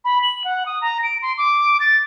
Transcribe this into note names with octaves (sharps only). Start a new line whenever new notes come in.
B5
F#7
F#5
D#6
A#5
D7
C6
D6
A6